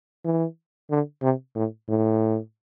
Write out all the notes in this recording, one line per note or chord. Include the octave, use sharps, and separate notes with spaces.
E3
D3
C3
A2
A2